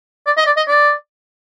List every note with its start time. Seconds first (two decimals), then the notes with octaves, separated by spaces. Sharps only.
0.26 D5
0.37 D#5
0.46 D5
0.57 D#5
0.68 D5